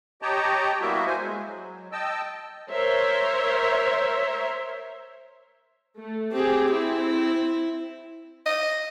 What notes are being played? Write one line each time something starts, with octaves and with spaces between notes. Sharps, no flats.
G4 C#5 D#5 G5 A5 A#5
G3 A#3 B3 E4 F#4 E5
C5 G#5
G#3
F#3
D#5 G5 A5 E6
A#4 C5 C#5 E5
A3
C4 G4 G#4
C4 E4
D#5